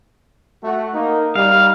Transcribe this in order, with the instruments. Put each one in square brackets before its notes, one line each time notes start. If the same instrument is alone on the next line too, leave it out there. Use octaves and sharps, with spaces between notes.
[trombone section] A3 F#4
A#3 D#4
[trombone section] G3 D#4 [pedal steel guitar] F5